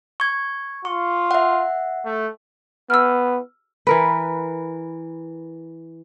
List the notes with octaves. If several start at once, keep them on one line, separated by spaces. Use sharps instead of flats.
C#6 G#6
F4 C#6
E5 F#5
A3
B3 E6 F6
E3 A#4 B4